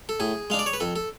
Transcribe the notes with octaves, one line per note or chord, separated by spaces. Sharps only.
A4
A2 G#4
G#3 D4 F5
D5
C#5
B4
F2 A4
A4